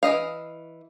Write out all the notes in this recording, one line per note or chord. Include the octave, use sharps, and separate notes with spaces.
E3 F4 D#5 F5